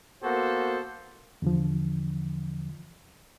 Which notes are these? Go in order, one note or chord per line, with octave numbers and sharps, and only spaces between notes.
A#3 B3 F#4 A4 C5
E2 D3 F3